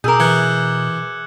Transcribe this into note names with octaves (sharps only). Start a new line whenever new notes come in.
B2 G#4 A#4 D6 E6 G6
E3 F#6 G#6 C#7